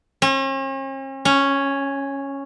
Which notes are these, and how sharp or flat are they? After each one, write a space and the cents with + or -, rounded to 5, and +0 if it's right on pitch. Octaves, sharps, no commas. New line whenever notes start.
C#4 -45
C#4 -5